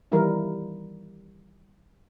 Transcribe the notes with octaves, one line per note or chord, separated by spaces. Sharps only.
D#3 E3 G3 E4 A#4